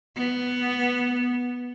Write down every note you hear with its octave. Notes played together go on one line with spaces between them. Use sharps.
B3